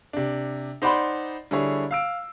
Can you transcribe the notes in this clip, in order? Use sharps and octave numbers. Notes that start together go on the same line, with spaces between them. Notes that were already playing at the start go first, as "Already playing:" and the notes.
C3 D4
D#4 C5 D5 F#5 B5 C6
D3 G3 E4 G#4 C#5
F5 E6 D7